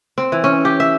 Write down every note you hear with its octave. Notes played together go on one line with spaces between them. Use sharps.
C4
E3
C#4
G4
E5